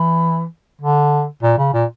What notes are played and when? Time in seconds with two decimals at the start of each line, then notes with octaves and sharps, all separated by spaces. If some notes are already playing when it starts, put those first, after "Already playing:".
Already playing: E3
0.81 D3
1.42 A#2
1.58 C#3
1.73 A#2